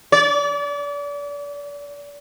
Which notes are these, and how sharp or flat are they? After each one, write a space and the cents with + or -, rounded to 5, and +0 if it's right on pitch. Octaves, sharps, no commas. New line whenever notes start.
D5 -35